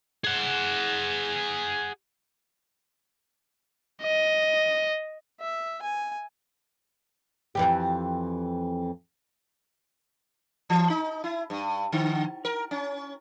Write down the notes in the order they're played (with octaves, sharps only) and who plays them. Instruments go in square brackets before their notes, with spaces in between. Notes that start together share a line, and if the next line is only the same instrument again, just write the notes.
[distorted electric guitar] G#4 F#5
[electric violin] D#5
[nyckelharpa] E5
G#5
[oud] F2 E3 G4
[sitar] E3
D#4
E4
G2
D3
A#4
C#4